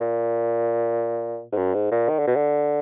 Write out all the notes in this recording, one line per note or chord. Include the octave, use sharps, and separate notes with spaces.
A#2
G#2
F#2
G#2
A#2
D#3
D3
B2
D3